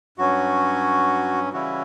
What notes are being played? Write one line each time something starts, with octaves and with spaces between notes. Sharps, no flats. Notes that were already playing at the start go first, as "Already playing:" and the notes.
G2 F#3 C#4 F#4
C#3 E3 G3 C#4 E4 F#4